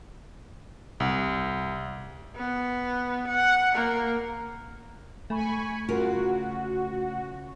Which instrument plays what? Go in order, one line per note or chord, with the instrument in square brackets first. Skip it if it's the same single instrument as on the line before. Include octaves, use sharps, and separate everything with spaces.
[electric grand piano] C2
[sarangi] B3
F#5
A#3
[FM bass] A3 [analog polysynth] G#5 B5 C#6
[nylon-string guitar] C#3 F4 A#4 [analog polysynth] F#4